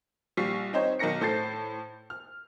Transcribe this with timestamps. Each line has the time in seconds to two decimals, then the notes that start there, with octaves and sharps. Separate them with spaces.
0.37 A#1 G3 C#6 B6 C7
0.73 C4 D#4 C5 C#5
0.99 B1 D#3 A#4 A#6 C#7
1.21 A2 A4 C5 G6 A6 C7
2.10 F6